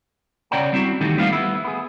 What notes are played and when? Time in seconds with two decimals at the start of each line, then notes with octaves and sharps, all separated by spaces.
0.51 C#3 C#5 D5 F#5 G5 A#5
0.72 G3 C4 E4 F#4
1.01 D#3 E3 A3 D#4 F#4 G4
1.18 G3 A3 B3 C4 F4 F5
1.33 B3 E4
1.65 B3 G#4